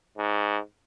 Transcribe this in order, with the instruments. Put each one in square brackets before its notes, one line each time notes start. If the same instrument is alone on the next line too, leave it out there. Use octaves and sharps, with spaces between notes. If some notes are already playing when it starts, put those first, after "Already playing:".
[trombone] G#2